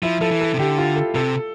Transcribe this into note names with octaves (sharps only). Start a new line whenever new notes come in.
F3 E4
F3 A4
E3
A4
C3
D3 G4
F4
A4
C3 A4